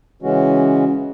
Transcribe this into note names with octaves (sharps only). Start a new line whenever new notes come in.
C#3 E3 G#3 C#4 F#4